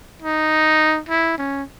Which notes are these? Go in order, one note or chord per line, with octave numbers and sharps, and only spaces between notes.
D#4
E4
C#4